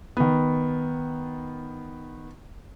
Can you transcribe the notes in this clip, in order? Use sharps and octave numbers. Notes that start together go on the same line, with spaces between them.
D#3 B3